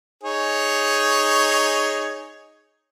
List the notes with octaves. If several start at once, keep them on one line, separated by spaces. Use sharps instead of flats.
D#4 G#4 C#5